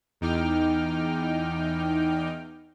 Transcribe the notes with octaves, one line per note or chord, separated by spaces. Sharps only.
E2 D#4 G5 D6 F6